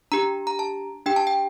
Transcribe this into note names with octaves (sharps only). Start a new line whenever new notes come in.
D4 G4 A#5
A#5
A5
D4 G4 G5
A5
G5